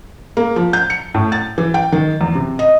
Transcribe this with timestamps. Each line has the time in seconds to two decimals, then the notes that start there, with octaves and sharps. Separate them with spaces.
0.37 A#3
0.56 F3
0.73 G6
0.90 C#7
1.14 A2
1.32 A6
1.58 E3
1.74 G5
1.92 D#3
2.21 E2
2.35 C3
2.59 D#5